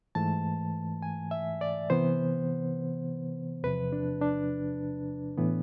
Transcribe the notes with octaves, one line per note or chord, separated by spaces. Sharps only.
G#2 E3 A3 A5
G#5
E5
D5
C3 E3 B3 C5
E2 C3 F3 B4
D4
D4
A2 E3 B3